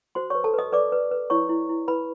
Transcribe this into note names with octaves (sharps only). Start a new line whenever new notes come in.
F#4 C5 C6
C#5 C#6
B4
A4 A5
B4 D#5 D#6
B4 D5 D6
B4
B4
E4 C#5 C#6
E4
E4
E4 B4 B5